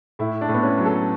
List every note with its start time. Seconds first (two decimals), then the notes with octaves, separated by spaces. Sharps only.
0.19 A2 E4
0.41 D4
0.49 A2
0.54 B3
0.63 C#4
0.78 F#3
0.85 A4